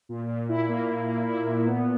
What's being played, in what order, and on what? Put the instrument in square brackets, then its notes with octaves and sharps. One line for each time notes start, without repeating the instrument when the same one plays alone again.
[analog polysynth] A#2
A#2
E4
A#3
A#3
A#3
E4
A#2
B3